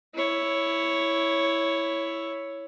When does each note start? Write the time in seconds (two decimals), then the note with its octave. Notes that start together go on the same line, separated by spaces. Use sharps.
0.15 E4 C#5